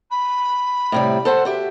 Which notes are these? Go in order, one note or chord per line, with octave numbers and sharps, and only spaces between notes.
B5
A2 C3 G3
A4 C5 F#5
F#4 G4 E5